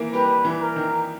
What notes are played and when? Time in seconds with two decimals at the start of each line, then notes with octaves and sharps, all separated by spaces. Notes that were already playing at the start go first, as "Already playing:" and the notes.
Already playing: D#3 E3 A#3 E4 A#4
0.13 G3 G4 B4
0.44 E3 E4
0.61 A#4
0.76 D#3 D#4